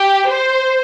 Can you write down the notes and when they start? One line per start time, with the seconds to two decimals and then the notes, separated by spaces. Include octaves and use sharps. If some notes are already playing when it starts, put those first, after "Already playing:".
Already playing: G4
0.28 C5